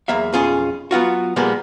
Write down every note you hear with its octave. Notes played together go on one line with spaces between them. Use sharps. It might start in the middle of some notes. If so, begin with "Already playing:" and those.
E2 F#3 A#3 E5 F5
B1 F2 C#4 F4 G#4
F#3 B3 F4 F#4
A#2 F3 G3 G#3 A#3 B3